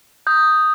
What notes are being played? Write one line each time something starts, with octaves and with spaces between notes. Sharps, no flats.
D#6 G6